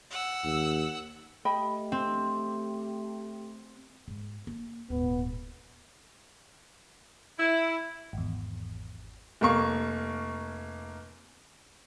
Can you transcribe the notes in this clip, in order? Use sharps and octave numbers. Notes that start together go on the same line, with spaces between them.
F#5 E6
D#2
A3 G4 D#5 G5 B5
C4
G#2
A#3
D#1 D#2 G#2 B3
E4
G#1 E2
F1 A#3 C#6